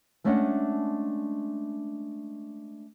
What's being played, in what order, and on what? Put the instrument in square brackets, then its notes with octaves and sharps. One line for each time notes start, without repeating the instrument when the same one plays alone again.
[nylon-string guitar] G#3 A3 C#4 D4 D#5 F#5